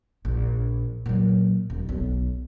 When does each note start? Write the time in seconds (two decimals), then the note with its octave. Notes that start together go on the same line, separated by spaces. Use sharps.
0.25 A#1
1.06 A#2 F#3
1.70 D#1
1.89 B1